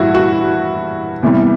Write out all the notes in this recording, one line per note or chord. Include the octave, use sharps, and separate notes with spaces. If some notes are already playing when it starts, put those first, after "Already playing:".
Already playing: G2 E3 G3 E4 F#4
F#4
E2 C3 E3 G3